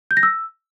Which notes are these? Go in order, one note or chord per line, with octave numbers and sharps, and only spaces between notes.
G6
A#6
E6